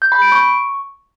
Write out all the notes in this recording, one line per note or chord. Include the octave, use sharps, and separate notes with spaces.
G6
B5
D7
C#6